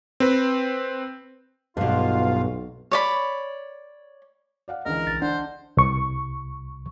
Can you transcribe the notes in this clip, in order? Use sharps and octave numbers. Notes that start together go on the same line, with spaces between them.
C4 B4
B1 G2 B2 F4 F5
C#5 D5 B5
D5 F5 F#5
C#2 D3 E3 A#4 D#5
A#1 A6
D4 C5 F#5
C2 C#6